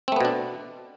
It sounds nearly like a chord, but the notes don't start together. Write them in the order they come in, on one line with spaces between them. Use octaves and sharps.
C4 A3 B3 B2 D4